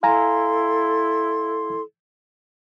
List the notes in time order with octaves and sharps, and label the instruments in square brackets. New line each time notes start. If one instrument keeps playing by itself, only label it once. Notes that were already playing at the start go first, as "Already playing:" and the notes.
[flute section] E4 A4 C6 [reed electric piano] F5 G#5 A#5